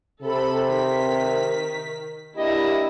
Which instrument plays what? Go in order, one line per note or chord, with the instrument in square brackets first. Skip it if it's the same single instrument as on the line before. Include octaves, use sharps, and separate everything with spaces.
[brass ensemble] C3 [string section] A4 B5
[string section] D#3 B6
[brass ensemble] A#3 D4 G4 [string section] E4 [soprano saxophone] D#5